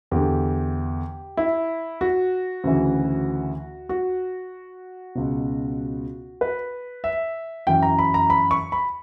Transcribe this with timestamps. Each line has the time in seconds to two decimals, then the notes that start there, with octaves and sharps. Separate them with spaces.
0.11 E2 D3 G4
1.37 E4
2.01 F#4
2.64 D2 C#3 E3
3.89 F#4
5.15 C#2 B2
6.41 B4
7.04 E5
7.67 F#2 E3 G5
7.83 A#5
7.99 B5
8.14 A#5
8.30 B5
8.51 C#6
8.72 B5